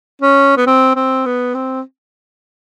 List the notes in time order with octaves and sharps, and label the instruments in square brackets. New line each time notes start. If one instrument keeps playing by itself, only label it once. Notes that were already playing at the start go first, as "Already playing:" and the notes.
[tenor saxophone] C#4
B3
C4
C4
B3
C4